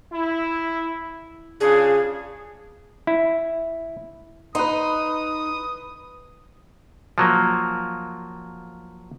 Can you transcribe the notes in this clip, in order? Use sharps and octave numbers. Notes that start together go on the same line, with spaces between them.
E4
C#3 D4 F4 G#4
E4
D#4 B4 C6 D#6
F3 F#3 A#3